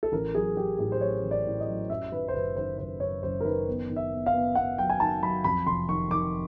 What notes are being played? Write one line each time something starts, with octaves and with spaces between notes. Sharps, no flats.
A4
A1 A#4
F#3 G#4
F#3 G4
A2 G#4
C5
F#3 C#5
A1
D5
A2
D#5
F#3
F#2 E5
D#3 B4
C5
F#1 B4
D#3 C5
F#1 C5
F#2 C#5
F#1 C5
A#4
D#3 B4
B3
D#3
E5
B3
F5
B3
B3 F#5
F#3 G5
G#5
D#3 A5
F#3 B5
F2 B5
F1 C6
D#3 C#6
D#3 D6